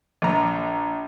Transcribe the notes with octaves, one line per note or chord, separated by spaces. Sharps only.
A#1 A#5